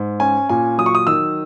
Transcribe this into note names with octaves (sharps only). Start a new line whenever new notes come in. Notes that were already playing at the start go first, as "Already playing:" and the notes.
Already playing: G#2
C#4 G#5
A#2 G#5
F#3 D#6
C#6
D#6
D#3 E6